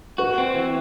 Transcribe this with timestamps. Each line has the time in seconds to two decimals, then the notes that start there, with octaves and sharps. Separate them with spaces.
0.18 F#4 B4
0.38 C4
0.56 E3